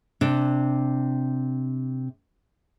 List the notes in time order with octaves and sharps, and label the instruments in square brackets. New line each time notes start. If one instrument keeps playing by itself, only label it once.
[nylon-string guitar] C3 D4